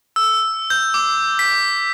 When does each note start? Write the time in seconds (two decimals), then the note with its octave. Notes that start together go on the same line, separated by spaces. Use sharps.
0.16 E6
0.70 G6
0.94 D6
1.39 B6